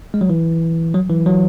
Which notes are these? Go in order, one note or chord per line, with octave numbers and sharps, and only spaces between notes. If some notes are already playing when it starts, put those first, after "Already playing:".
G#3
F#3
E3
F#3
E3
F#3